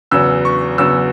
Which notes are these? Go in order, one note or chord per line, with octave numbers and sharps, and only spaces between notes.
E2 C#3 F#3 B3 E6
C#6
E2 C#3 F#3 B3 E6